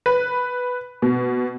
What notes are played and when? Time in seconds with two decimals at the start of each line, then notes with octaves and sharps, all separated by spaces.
0.06 B4
1.02 B2